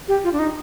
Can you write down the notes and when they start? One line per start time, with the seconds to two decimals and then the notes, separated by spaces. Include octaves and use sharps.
0.08 G4
0.24 F4
0.33 D4
0.39 D#4